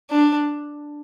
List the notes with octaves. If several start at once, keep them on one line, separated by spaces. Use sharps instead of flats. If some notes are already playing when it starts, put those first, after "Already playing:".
D4